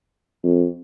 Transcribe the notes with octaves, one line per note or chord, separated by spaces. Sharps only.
F2